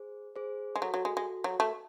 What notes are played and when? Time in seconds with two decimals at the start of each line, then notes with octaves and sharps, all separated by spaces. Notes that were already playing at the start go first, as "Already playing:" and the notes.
Already playing: G#4 C5
0.36 G#4 C5
0.76 G#3
0.82 F#3 F#4 A4
0.94 F#3
1.05 G#3
1.17 G#3
1.44 F#3
1.60 A3